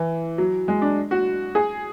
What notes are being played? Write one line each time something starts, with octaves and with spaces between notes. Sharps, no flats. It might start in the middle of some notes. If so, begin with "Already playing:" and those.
Already playing: E3
F#3
G#3
D4
F#4
G#4